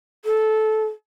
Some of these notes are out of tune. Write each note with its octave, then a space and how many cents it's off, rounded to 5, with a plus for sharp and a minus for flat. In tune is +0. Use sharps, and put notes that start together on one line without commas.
A4 -15